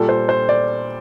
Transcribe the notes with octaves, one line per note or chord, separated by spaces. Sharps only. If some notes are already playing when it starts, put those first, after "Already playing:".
Already playing: A#2 G3 A4
C5
C5
D5